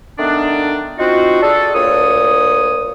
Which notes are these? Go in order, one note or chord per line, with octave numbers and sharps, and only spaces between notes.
D#3 A3 B3 D4
C4 D#4 F4 F#4
D4 G#4 A4
D2 A#2 C#5 D#6